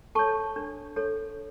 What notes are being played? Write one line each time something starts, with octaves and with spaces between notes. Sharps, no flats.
A4 C#5 A5 C#6
D4
A4 C#5